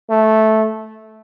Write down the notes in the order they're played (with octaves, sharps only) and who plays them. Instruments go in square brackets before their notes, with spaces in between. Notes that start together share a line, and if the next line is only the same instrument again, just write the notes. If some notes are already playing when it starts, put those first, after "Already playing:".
[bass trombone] A3